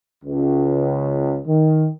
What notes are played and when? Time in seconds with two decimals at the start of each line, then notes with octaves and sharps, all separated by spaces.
0.24 C#2
1.46 D#3